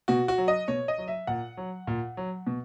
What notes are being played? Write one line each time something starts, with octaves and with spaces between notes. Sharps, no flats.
B2 F#4
F#4
F#3
D#5
B2 C#5
D#5
F#3
E5
A#2 F#5
F#3
A#2
F#3
B2